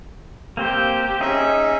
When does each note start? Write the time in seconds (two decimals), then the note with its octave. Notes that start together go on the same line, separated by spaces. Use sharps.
0.57 A#3 C4 G4 C5
1.21 C#4 D#4 G#4 E5